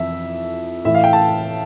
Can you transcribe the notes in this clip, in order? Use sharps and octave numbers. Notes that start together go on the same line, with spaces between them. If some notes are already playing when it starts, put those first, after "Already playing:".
Already playing: F2 E3 E5
A2 E3 E5
F5
G5
A5